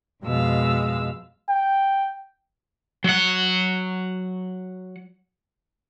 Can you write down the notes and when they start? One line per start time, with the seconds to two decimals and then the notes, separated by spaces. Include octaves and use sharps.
0.23 F2 B2 G#3 F5 E6
1.48 G5
3.04 F#3 F#5